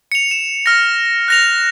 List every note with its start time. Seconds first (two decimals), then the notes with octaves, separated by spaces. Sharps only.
0.12 C#7 F7
0.31 E7
0.66 F6 A#6
1.28 F#6 A#6 F7